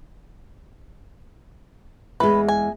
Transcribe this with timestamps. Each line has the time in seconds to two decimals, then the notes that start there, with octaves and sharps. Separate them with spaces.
2.20 E2 G#3 B4
2.49 G#5